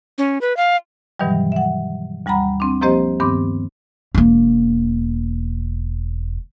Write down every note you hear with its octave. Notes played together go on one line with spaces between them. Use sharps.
C#4
B4
F5
G2 B2 D#3 E3 F#3 G3
E5 F#5
D2 G3 F#5 A#5 B5
C4 D4
F3 A#3 C4 G4 C5 D#5
G2 D#3 B3 C4 D6
E1 A#3